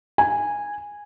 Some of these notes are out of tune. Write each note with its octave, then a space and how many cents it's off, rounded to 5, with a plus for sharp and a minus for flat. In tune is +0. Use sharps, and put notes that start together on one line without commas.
G#5 -10